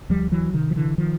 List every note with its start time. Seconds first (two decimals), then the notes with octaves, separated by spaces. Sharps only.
0.09 D2 F3 G3
0.32 E3 F#3
0.53 C3 D#3
0.70 F3
0.76 D3 E3
0.98 D#3 F3